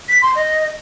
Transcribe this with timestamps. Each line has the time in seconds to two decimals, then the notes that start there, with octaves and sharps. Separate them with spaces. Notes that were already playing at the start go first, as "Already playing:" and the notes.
0.09 B6
0.22 C6
0.35 D#5